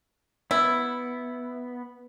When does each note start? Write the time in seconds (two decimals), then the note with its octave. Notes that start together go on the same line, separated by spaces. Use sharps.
0.51 B3 E4